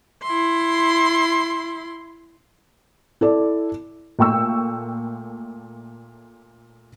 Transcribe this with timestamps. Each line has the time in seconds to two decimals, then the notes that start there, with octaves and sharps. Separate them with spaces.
0.23 E4 C6
3.21 E4 A4 D5
4.19 A#2 A3 G5 C#6 E6